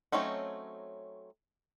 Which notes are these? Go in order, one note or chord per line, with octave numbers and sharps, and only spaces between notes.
F#3 A3 C4 C#4 D#4